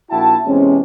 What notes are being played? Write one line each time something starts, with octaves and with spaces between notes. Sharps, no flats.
A#1 E4 F#4 G5 A5
E2 C3 G#3 C4 C#4